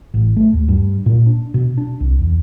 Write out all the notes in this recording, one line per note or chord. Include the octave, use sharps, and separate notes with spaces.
A1
A3
D#2
G2
A#2
D4
B2
D4
C2
E2